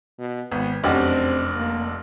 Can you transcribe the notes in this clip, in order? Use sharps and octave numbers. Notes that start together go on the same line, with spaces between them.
B2
G#1 B3
F1 F#2 C4 D4 G4 D#5
A#3